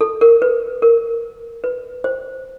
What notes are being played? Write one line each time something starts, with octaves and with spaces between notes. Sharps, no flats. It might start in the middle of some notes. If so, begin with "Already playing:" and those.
A4
A#4
B4
A#4
B4
C5